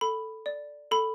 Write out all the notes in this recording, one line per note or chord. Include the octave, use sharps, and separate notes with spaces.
A4 B5
D5
A4 B5